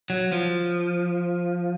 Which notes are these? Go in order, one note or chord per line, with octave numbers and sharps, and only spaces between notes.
F#3
F3